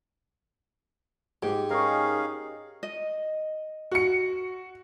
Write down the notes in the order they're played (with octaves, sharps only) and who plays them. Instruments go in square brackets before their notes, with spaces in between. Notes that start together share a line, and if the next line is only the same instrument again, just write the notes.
[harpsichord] G#2 [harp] G4
[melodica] C#4 G#4 F5 [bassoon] D#4 [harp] A#4 C#6
[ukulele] D#5
[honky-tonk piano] F#4 C#7